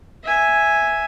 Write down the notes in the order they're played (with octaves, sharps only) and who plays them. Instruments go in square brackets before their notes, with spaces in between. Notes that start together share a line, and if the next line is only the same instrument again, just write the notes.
[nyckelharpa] E5 G#5